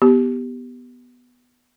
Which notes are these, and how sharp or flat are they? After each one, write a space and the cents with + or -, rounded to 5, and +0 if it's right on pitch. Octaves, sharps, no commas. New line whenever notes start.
B3 +0 G4 +0